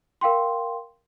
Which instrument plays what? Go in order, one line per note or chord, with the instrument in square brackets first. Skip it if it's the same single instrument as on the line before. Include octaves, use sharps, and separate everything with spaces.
[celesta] A#4 F5 G5 C6